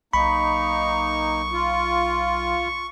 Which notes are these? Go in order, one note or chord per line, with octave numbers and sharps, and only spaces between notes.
B1 A#3 D#4 B5 C#6
F4